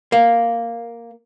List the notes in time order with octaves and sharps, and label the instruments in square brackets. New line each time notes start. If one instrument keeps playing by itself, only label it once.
[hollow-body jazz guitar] A#3